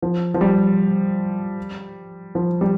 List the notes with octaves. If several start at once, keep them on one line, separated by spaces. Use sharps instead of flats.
F3
F3
G3
F3
G3